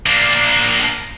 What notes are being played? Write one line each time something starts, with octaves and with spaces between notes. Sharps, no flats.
A#3 D4